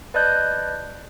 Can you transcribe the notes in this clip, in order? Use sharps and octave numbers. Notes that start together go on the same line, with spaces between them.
B4 D5 D#5 A5 F#6 G6